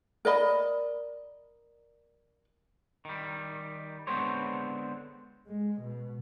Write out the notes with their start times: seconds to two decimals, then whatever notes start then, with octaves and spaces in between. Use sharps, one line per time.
0.25 A#4 D5 D#5 B5
3.05 D#3 G3
4.07 D3 G#3 B3 C4 C5 C#5
5.48 G#3
5.81 B2